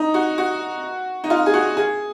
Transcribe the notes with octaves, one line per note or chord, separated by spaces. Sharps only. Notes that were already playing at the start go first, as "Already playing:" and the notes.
Already playing: D#4
F#4
F#4
D#4
F4
G#4
F#4
G#4